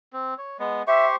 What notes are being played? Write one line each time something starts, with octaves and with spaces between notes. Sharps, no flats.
C4
C#5
G#3 B3
G4 C5 E5 C#6